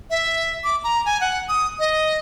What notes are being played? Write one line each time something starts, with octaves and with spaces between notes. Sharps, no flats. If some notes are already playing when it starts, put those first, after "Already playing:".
E5
D6
A#5
G#5
F#5
D#6
D#5